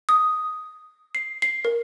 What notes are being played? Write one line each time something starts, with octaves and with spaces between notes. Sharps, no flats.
D#6
C7
C7
A#4